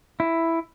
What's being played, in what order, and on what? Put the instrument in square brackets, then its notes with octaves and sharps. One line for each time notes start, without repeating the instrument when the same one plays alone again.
[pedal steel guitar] E4